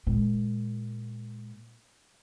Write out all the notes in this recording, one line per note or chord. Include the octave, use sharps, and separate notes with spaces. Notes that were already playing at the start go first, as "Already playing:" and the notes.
A#2 G#3